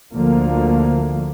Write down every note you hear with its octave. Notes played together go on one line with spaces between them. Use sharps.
D2 D3 F3 A#3